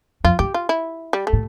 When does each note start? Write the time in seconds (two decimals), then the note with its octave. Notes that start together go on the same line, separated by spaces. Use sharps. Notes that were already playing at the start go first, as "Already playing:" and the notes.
0.24 F2 F4
0.39 G2 G4
0.54 F4
0.69 E4
1.13 G3
1.27 A3
1.33 A2